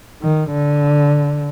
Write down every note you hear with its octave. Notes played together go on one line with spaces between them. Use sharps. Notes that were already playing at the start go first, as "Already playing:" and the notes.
D#3
D3